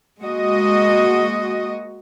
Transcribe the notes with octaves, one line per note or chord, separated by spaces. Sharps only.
G#3 A#3 F#4 D#5